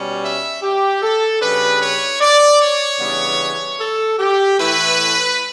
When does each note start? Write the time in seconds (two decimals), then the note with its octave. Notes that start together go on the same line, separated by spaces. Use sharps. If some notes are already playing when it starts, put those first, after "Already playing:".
Already playing: B2 G3 C#4
0.23 E5
0.63 G4
1.02 A4
1.41 C#3 G3 D4 B4
1.81 C#5
2.21 D5
2.61 C#5
3.00 C#3 E3 G3 B3 D4
3.80 A4
4.19 G4
4.59 A2 E3 A3 E4 B4